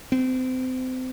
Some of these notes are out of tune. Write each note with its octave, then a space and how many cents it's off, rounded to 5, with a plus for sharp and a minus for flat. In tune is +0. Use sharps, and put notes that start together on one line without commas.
C4 -30